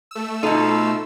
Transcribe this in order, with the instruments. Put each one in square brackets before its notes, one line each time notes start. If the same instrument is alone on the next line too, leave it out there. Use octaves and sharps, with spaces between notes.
[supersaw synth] A3 E6
[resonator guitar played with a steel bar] B2 A4 [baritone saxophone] F3 [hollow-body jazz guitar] D#4